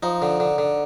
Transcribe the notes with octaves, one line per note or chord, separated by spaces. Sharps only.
F3 D#4
D3
D3
D3